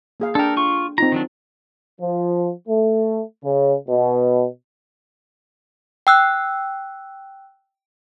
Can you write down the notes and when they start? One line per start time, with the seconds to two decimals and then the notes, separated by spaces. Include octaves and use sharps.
0.20 A#3 G#4 F5
0.35 D4 A4 A#4 G5
0.57 F4 C#6
0.98 C4 D#4 F4 A#5
1.12 D#3 F#3 D4
2.01 F3
2.68 A3
3.44 C#3
3.88 B2
6.07 G5 E6 F#6